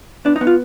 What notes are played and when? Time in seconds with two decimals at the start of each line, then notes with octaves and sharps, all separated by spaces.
0.25 B3 D4
0.36 D#4
0.41 B3
0.47 F4